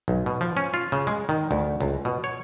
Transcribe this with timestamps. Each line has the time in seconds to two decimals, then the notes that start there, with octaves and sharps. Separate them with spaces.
0.08 B1
0.26 B2
0.41 F3
0.57 C#4
0.74 F4
0.92 C#3
1.07 G#3
1.29 D#3
1.51 D2
1.81 C#2
2.05 B2
2.24 C#5